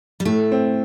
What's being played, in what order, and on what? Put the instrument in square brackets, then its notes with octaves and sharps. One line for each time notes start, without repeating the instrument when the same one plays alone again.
[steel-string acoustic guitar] G3
[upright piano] A2 [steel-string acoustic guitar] A3
[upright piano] C4